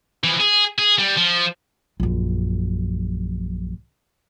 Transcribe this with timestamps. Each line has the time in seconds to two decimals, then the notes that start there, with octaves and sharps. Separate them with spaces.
0.24 E3 F3
0.40 G#4
0.79 G#4
0.98 G3
1.17 F3
2.00 A#1 F#2